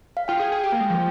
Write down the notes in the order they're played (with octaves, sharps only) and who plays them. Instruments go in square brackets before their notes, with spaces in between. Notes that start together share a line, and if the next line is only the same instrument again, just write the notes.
[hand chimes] F5
[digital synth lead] F4 [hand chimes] G5
[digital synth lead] G#4
G#4
[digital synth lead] G4 [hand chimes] G5
[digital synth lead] A#3
G#3
F3